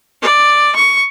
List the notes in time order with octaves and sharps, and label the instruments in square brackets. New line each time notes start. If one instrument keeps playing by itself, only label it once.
[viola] D5
C#6